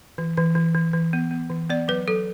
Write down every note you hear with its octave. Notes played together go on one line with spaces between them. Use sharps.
E3
E3
E3
E3
E3
B3
B3
E3
B3 D5
F#3 B4
F#3 A4